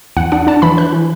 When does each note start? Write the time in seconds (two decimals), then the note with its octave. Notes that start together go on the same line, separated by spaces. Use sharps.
0.17 E2 F#5
0.32 D4 F#5
0.47 D4 A5
0.62 E3 B5
0.77 E3 F#6
0.93 E3